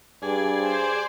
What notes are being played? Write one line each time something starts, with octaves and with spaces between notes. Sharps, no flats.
G2 G#4 D5
C5